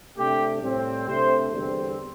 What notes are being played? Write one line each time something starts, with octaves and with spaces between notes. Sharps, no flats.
C3 A3 D4 G4
A2 G3 C4
C3 A3 D4 C5
E2 D3 G3 C4